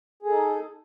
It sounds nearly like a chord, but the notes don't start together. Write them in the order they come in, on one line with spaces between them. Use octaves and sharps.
G#4 A4 D#4